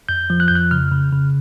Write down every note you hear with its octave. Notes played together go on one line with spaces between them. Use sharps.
F2 G6
F3
F#6
F2 G6
F#6
C#3 F6
C#3
C#3